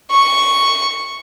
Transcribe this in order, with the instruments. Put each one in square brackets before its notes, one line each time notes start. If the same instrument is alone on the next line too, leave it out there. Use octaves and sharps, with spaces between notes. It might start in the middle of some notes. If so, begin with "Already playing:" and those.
[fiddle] C#6